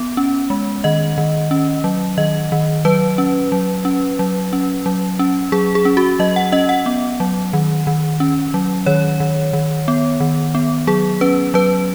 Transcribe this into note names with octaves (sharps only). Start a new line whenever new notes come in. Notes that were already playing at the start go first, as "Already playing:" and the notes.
Already playing: B3
C#4
G#3
D#3 D#5
D#3
C#4
F#3
D#3 D#5
D#3
F#3 B4
C#4
F#3
C#4
F#3
C#4
F#3
C#4
F#3 G#4
G#4
C#4
F#4
F#3 D#5
F#5
C#4 D#5
F#5
B3
F#3
D#3
D#3
C#4
F#3
D#3 C#5
D#3
D#3
B3
D#3
B3
F#3 G#4
C#4 B4
F#3 B4